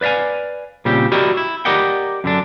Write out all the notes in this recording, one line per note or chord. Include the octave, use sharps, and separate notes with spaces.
B4 D5 E5 F5 G#5
A#2 C#3 G3 C4 G4
E4 F#4 G4 A#4 D5 D#5
E4
G4 A#4 D5 D#5 F#5 G5
F#2 D3 D4